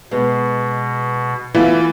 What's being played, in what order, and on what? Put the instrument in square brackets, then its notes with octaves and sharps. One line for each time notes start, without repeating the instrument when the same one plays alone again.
[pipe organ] B2 [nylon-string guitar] G#3 [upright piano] B3
[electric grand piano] E3 [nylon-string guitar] A3 B3 E4 [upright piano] F4 [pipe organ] A6